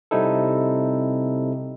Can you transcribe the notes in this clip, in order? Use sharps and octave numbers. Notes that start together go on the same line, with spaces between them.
C3 G3 C4 D#4 E4 A4